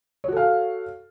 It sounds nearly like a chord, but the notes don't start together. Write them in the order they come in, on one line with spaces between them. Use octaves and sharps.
C#5 F#4 A4 F5